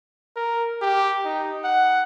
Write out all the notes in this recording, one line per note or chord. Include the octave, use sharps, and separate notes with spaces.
A#4
G4
D#4
F#5